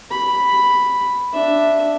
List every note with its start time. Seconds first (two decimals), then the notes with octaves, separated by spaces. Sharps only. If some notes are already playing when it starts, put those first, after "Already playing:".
0.11 B5
1.33 D4 E5